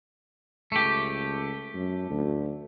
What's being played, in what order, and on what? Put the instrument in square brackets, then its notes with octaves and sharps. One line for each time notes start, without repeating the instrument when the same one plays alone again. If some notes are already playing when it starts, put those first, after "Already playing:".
[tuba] C#2 [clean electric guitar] A3 G4
[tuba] F#2
D2